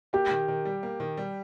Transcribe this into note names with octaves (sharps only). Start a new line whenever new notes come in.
A#3 G4
D#3
D#3
G3
A#3
D#3
G3